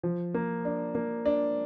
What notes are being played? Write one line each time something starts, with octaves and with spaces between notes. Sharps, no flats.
F3
A#3
D4
A#3
D4